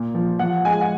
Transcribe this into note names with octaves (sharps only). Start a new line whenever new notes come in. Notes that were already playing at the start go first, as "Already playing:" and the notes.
Already playing: A#2
F3
F3 F#5
G#3 G#5
F#5